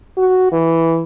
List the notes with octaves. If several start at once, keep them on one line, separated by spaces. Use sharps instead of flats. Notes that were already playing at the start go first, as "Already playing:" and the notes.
F#4
E3